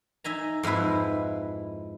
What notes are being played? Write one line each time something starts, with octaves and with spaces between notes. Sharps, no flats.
D#4 E5 G#5 A#5
F2 G#2 G#3 E4 B4